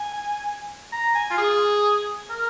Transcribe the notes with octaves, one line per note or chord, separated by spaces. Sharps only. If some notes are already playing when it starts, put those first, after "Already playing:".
Already playing: G#5
A#5
G#5
F4
G#4
A#4